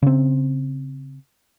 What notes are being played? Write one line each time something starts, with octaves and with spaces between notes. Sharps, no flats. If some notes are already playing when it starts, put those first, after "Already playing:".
C#3 C4